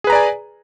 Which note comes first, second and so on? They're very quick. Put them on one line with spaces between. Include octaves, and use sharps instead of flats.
G#4 B4 A#5 D5 G#5